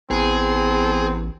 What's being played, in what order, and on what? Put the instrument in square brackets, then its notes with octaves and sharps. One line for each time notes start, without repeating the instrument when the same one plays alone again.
[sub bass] A1 [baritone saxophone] E2 [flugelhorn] C4 [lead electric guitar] G#4